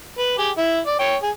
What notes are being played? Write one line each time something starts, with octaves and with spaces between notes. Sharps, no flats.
B4
G4 G#4
E4
D5
C#5 G5
G#4